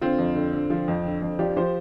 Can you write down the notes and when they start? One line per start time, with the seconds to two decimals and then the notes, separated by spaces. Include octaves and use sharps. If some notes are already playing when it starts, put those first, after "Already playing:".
0.01 D3 C4 F4
0.18 F2
0.35 D3
0.53 D3
0.70 F3
0.88 F2
1.05 D3
1.22 F2
1.39 F3 D4 G4
1.57 F3 G4 C5